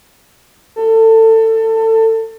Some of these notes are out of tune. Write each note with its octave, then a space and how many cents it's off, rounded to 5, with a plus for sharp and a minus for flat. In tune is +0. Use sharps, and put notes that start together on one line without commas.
A4 +25